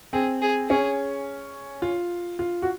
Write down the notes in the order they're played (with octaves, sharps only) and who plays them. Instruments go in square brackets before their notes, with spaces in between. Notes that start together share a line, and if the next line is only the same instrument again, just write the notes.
[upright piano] C4 [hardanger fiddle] G#4
[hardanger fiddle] G#4
[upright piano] C#4 [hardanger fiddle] G#4
[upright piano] F4
F4
F#4